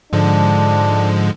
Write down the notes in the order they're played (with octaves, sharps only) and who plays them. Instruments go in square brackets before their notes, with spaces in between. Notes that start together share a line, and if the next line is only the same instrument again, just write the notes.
[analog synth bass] G#2 [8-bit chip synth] D3 F3 G#3 [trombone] D4